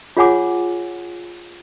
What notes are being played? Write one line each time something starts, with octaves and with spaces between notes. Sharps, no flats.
F4 G#4 C#5 F#5 G#5 D6